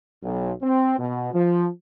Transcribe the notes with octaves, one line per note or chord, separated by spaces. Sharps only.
B1
C4
B2
F3